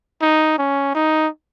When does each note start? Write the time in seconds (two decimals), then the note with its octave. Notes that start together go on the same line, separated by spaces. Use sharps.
0.21 D#4
0.58 C#4
0.95 D#4